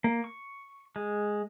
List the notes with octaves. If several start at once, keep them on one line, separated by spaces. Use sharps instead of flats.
A#3
C#6
G#3